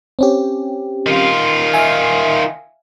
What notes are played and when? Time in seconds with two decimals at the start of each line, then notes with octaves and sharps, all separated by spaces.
0.19 C4 C#4 G4
1.06 D#3 F4
1.74 E5 F5 G#5